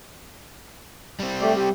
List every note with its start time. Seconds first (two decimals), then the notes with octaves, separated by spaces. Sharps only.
1.20 G3 C4
1.41 A3 G4 D5
1.56 G4